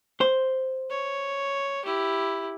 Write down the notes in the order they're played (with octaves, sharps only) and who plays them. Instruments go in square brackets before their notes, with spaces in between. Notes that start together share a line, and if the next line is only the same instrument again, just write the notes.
[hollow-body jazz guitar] C5
[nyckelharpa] C#5
E4 G4